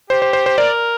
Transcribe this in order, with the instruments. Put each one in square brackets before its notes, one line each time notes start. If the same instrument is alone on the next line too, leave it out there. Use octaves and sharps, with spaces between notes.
[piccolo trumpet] G4 [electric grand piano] C5
[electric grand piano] C5
C5
C5
[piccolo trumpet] A#4 [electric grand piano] D5